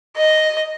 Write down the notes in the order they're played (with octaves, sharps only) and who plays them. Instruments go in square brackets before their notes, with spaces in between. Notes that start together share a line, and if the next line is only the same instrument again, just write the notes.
[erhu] D#5